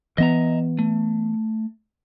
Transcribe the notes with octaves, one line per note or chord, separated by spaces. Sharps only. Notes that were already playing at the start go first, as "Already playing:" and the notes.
E3 B3 D#5 E5 A#5
A3